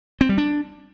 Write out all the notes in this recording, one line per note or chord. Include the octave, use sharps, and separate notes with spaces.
C4
G3
D4